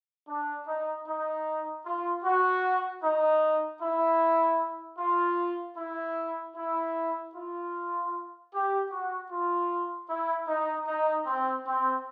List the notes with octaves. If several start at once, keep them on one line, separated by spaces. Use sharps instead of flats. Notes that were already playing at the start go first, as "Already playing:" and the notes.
D4
D#4
D#4
F4
F#4
D#4
E4
F4
E4
E4
F4
G4
F#4
F4
E4
D#4
D#4
C4
C4